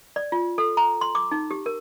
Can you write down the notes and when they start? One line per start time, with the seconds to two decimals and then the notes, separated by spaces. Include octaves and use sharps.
0.16 D5
0.32 F4
0.58 A4
0.77 A#5
1.01 C6
1.15 D6
1.31 D#4
1.51 G4
1.66 A#4